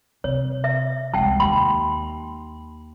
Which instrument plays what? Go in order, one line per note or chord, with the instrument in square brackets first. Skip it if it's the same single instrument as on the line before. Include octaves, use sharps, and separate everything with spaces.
[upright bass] C3 [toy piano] C#5
[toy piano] E5
[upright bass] C2 G#3 [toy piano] F#5 G5 A5
[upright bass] D#2 [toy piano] G5 B5 C6